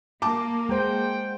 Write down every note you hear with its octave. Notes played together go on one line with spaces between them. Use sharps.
A#3 A5 D6
G#3 C5 F#5 G5